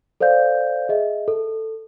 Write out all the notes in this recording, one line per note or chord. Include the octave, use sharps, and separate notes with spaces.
A4 C5 D5 F5 G6
G#4 D#5 E5
A4